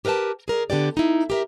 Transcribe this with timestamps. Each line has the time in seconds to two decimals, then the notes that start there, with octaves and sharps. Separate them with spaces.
0.05 G4 A#4 B4 E5 A5
0.48 G#4 A#4 D5
0.70 D3 B3 G4 D5
0.97 D#4 E4
1.30 G4 A#4 E5